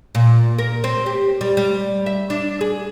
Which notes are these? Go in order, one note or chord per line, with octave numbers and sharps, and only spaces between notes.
A#2
A#4
C4
G4
G3
G3
E5
D4
G#4